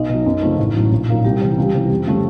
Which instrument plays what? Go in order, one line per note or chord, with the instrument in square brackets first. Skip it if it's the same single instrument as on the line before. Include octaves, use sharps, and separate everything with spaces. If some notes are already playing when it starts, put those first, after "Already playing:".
Already playing: [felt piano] B1 [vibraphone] D#4 D#5
[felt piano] B2 F#3
F#2
C#3 F3 A3 C4
A1
A2 F#3 A3 C#4
A#1
A#2 F#3 A#3 D#4
[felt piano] C2 [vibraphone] G3 G4
[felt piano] C3 E3
C#2
C3 E3
F2
C#3 F3 A3